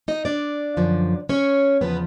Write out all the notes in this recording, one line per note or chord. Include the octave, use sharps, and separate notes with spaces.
D#4 D#5
D4 D5
F#2 D3 F3
C#4 C#5
E2 C#3 F3 B3 B4